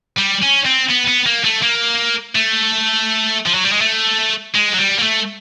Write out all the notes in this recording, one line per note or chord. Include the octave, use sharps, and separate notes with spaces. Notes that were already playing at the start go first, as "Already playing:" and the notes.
G3
C#4
C4
B3
B3
A#3
A3
A#3
A3
F3
F#3
G3
G#3
A3
G#3
F#3
G3
A#3
A3